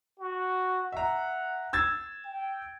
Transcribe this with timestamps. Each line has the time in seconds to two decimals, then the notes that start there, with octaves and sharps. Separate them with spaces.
0.19 F#4
0.92 E5 F#5 A#5
1.73 E6 G#6 A6
2.25 G5